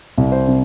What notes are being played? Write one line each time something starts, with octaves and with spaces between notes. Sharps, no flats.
C2
C5
C3